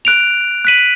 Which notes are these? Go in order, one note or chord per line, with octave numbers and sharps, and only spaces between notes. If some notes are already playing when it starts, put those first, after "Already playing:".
F#6 D7 F7
F#6 B6 D#7 F#7